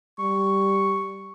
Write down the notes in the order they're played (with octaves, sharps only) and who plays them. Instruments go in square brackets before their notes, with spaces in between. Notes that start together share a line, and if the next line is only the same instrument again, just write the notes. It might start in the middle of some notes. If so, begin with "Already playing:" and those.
[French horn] G3 [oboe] C#6